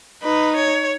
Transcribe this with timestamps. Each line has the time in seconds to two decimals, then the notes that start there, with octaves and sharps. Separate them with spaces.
0.22 D#4 B4
0.56 C#5